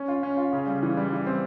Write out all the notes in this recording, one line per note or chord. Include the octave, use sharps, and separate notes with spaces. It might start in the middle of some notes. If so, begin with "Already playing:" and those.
Already playing: C#4
F4
C#4
F4
C#3
G3
E3
G3
E3
C4